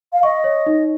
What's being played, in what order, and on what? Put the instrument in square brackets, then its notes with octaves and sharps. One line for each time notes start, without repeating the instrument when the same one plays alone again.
[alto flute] F5
[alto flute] D#5 [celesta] C#6
[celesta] C#5
D#4